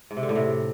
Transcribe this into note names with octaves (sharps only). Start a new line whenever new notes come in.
G#2
C3
D3
A2
C3